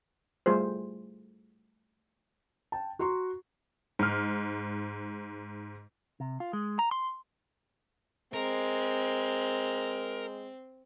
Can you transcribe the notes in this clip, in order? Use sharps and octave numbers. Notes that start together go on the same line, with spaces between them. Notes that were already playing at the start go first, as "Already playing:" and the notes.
G3 A3 F4 G#4 C5
G5 A5
F#4 A#5 C6 C#6
G#2 F6
C3
F4
G#3
A#5
C6
G#3 C4 A#4